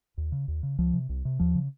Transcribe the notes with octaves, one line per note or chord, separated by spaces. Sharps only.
D#2
C#3
D#2
C#3
C#2 F3
C3
C2
C3
D#2 F3
C#3